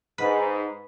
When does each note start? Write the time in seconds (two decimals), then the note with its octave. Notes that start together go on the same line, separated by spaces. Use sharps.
0.18 G#2 B4